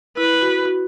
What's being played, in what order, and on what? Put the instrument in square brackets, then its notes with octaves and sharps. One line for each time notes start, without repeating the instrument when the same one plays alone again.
[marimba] E4 [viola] B4
[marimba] F#4
F#4